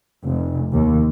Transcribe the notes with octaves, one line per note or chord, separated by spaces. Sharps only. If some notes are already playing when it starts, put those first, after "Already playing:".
F1
D#2